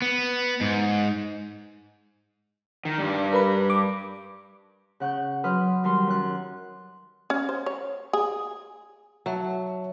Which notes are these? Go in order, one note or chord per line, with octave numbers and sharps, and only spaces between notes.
B3
G#2
D#3
G2 G3
A#4 B4 B5
D6
C#3 F#5 C#6 G6
F#3 B4 C6 D#6 F6
D#3 G3 C6
F#2 F#6
C#4
C5
C#5
G#4
F#3 C#5 E5 A5